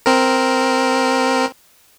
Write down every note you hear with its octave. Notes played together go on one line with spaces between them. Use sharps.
C4 A#4